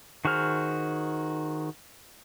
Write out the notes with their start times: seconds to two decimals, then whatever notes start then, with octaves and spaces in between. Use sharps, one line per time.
0.25 D#3 F#4 G#4 C5 F6